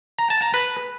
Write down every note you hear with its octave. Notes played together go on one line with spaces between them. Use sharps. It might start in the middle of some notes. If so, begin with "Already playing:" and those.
A#5
A5
A#5
B4